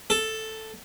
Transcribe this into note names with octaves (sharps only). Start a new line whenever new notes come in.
A4